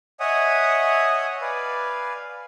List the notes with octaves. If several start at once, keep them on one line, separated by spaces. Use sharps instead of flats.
C#5 D#5 E5 F#5 G#5 D#6
B4 D5 F5 G#5